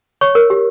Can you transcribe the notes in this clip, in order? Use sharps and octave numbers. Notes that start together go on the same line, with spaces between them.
C#5 C#6
A#4
G4